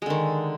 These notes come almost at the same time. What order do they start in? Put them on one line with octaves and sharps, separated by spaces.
G#3 D3 D#3